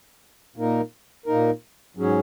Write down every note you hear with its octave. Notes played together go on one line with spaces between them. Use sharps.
A#2 A#3 D#4 A#4
A#2 A#3 D#4 A#4
G#2 F#3 C#4 G#4